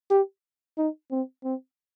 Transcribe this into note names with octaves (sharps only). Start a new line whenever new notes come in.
G4
D#4
C4
C4